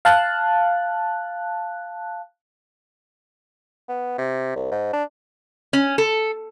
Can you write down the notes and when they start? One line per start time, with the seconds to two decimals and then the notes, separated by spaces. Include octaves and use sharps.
0.05 F5 A5 F#6
3.88 B3
4.18 C3
4.56 C2
4.71 G#2
4.93 D4
5.73 C#4
5.98 A4